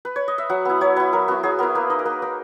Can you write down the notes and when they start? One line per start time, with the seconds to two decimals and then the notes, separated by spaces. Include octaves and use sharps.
0.05 B4
0.16 C#5
0.28 D#5
0.38 E5
0.50 F#3 F#5
0.65 B3 E4
0.81 F#3 C#5
0.96 B3 E4 B4
1.13 F#3 A#4
1.28 B3 E4 F#4
1.43 F#3 G#4
1.59 B3 E4 A#4
1.75 A#3 B4
1.90 D#4 D#5
1.99 A#4
2.05 A#3 B4
2.22 D#4 A#4